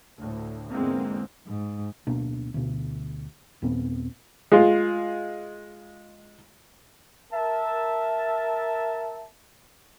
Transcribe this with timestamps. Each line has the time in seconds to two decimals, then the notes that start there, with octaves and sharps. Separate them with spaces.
0.16 D2 A2
0.70 E2 G#2 D3 G#3 A#3 C4
1.47 G#2
2.07 D1 B2 A#3 D4
2.54 D2 B2
3.62 D#2 A#2 B3 C4
4.52 G#3 F4
7.33 A#4 E5 A5